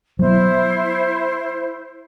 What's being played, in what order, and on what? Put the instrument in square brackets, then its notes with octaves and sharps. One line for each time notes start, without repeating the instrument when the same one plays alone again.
[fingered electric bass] F#3 B3 [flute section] E4 C5